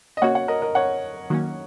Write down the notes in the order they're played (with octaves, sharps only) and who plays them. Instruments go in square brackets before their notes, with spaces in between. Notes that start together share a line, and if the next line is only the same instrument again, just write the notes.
[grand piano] D#5
[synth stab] C#3 A#3 F#4 [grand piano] C#5 F#5
[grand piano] C#5 F#5
A#4 D#5
A#4 D#5
C#5 F#5
[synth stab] D#3 F#3 A#3 C#4